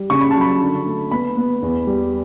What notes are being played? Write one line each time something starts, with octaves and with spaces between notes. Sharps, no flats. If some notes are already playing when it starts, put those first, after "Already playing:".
Already playing: G3
C#3 C#6
B5
F#3 A5
B5
D3
A3
B3 B5
B3
E2
G3